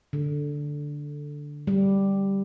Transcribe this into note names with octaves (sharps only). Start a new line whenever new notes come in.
D3
G3